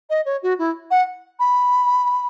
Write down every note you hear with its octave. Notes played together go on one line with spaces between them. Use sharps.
D#5
C#5
F#4
E4
F#5
B5